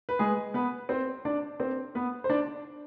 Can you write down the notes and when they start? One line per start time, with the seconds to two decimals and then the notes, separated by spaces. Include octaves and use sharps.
0.09 B4
0.19 G#3 G#4
0.54 B3 B4
0.89 C4 C5
1.25 D4 D5
1.60 C4 C5
1.95 B3 B4
2.24 C5
2.30 D4 D5